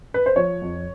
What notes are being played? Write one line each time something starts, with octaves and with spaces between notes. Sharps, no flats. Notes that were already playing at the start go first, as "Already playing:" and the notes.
B4
C5
F3 C#5
F2